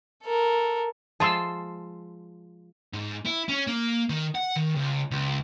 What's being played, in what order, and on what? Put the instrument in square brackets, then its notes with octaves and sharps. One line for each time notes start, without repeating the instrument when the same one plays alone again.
[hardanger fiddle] A4 A#4
[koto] F3 G#3 F4 [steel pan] A5 C6 E6
[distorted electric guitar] G#2
E4
C#4
A#3
D#3
F#5
D#3
C#2
C#2